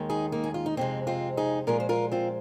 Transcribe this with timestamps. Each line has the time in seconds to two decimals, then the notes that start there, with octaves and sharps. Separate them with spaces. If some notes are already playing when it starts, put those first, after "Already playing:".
Already playing: D#2 D#3 G#3
0.09 D#4 G#4
0.32 A#3 D#4
0.44 G#4
0.54 F4
0.66 D#4
0.77 F2 C3 G#3 C4
1.07 C4 F4
1.37 D#4 G#4
1.67 A#2 F3 G#3 F4 A#4
1.80 C5
1.89 F4 A#4
2.12 C4 F4